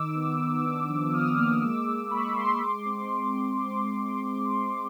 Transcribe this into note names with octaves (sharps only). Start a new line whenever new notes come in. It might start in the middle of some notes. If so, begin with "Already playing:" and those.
Already playing: D#3 D#4 D6 E6
B3
D#3
D4 D6 E6
F3
F3 D#6 F6
A#3
G#3 D6 E6
G#3
G#3 B5 C#6
G#3 C6 D6
G#3 C6 D6
C4